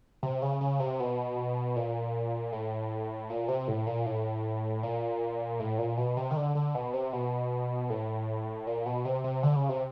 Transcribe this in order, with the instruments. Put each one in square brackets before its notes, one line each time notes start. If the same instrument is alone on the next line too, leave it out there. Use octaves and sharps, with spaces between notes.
[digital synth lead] C3
C#3
C#3
C3
B2
A#2
A2
A#2
C3
A2
A#2
A2
A#2
A2
A#2
B2
C3
D#3
D3
D3
B2
C3
B2
A2
A#2
B2
C3
C3
D3
C#3
C3